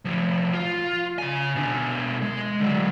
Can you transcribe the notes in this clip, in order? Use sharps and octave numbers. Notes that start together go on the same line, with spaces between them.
A2 F3
F4
C#3 G#5
B2 D4
G#3
D3 F#3